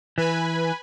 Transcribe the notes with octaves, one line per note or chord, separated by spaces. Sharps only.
E3 B4 G#5 B5